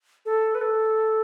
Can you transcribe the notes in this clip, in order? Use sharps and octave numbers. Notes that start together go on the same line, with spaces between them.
A4
B4
A4